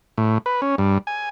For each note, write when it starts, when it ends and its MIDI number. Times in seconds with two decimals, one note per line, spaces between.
0.18 0.38 45
0.46 0.61 71
0.62 0.75 61
0.78 0.98 43
1.07 1.29 80